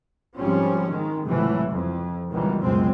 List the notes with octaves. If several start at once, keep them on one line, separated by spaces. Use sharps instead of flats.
G#1 F3 G3 C4 C#4
D#3 G#3
C#2 A2 C3 E3 F#3
F2
C#2 B2 D#3 E3 G3
C#2 F#2 B2 G#3 C4